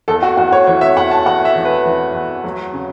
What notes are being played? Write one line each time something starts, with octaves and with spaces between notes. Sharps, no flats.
E2 A4
F#4
E2 F#4
C#5
E3 C#5
E5
E2 F#5
A5
E2 F#5
E5
E3
B4
E3
E2
F#3
C#3